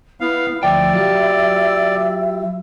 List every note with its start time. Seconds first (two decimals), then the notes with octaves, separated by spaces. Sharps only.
0.21 B3 E4 F5
0.63 D2 F3 D5 E5 G5
0.93 F#3 F4 G4